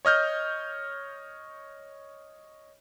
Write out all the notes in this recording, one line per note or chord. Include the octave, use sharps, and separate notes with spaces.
C#5 D#5 F6 G6